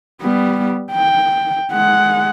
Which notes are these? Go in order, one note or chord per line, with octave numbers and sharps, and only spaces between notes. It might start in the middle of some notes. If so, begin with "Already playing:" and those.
G3 B3
G5
G#3 F#5